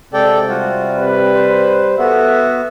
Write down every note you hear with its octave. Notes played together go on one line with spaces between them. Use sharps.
C3 G#3 A4 D5 G5
G3 F4 F#4
B4
C5
B3 F#4 A4 E5